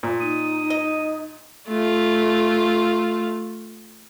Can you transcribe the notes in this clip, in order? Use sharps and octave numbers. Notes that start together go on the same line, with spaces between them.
A#2
D#4 D#6
D#5
A3 F4